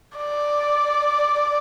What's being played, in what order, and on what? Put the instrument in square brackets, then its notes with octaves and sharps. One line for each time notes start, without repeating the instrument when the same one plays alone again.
[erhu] D5